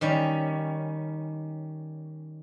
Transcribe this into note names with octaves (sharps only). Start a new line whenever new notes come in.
D#3 G3 C#4